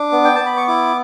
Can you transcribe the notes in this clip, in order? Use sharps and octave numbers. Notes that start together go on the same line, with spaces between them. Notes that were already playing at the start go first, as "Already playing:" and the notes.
Already playing: D4 D6
B3
G5
B3 A5
B5
C#6
E4 D6